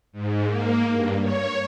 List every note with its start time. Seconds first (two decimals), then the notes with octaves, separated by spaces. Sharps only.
0.12 G#2
0.45 A#3
0.92 G2
1.22 C#5